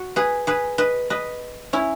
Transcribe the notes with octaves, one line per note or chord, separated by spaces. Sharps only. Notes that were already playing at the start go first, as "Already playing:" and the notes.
Already playing: F#4
G#4 B4
G#4 B4
B4 D#5
B4 D#5
C#4 E4